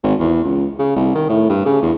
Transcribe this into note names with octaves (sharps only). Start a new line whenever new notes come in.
G#1
E2
C#2
C#3
C2
D#3
A2
G2
C#3
E2